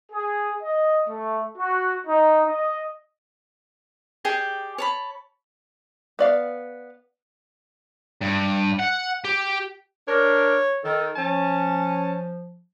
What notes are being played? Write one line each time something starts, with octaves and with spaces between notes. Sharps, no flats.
G#4
D#5
A3
F#4
D#4
D#5
G4 G#4 D5 G5
C#5 A5 B5
B3 D5 F5
G2
F#5
G4
D4 A#4 C#5
D#3 A4
F3 C#4 A5